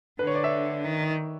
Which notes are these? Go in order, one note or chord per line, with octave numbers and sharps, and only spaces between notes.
D3 B4
C#5
D5
E5
D#3